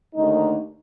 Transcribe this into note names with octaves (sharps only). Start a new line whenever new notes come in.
D#2 D3 A3 D#4